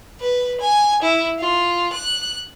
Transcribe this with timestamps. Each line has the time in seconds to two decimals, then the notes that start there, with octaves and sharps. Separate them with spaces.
0.20 B4
0.60 G#5
1.02 E4
1.39 F4
1.93 F#6